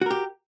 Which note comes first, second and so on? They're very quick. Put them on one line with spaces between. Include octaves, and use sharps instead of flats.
F#4 A#4 G4